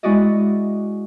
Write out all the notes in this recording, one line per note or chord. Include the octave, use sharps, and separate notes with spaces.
G#3 E4 F#4 D5 D#5